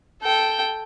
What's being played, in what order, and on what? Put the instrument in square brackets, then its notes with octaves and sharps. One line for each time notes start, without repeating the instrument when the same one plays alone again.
[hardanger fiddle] A4 G5